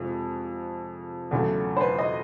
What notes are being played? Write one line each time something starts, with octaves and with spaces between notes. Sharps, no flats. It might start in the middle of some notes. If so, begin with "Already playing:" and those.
Already playing: F2 C3 G#3
E2 C#3 F#3 A3
C5
B4
D#5